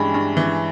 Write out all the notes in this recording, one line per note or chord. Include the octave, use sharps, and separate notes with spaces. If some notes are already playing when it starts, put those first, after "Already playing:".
Already playing: G2 E3 G#3 C#4 G5 G#5 B5
G2
E3